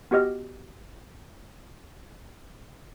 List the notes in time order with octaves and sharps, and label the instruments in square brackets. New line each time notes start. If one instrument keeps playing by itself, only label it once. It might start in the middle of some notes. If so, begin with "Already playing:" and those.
[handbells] B3 F#4 G4 D#5 F6